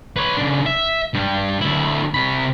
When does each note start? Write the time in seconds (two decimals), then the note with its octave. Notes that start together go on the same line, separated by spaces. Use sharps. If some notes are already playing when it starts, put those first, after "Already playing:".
0.16 B4 C#5
0.37 C#3 D4
0.66 E5
1.14 G2 G3
1.61 D2 E4
2.14 C3 B5